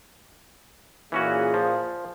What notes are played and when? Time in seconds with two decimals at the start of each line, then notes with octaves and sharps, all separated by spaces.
1.12 A#2 E3 A#3 C#4 F#4 G#4
1.54 F3